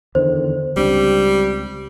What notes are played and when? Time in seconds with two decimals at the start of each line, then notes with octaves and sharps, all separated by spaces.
0.15 E2 D3 D#3 C5
0.77 C#2 G3 C4 D4